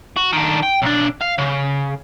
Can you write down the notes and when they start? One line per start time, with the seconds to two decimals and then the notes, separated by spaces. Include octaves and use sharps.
0.17 F#4
0.33 D#3 D4
0.63 G5
0.82 B1 D4
1.21 F5
1.38 C#3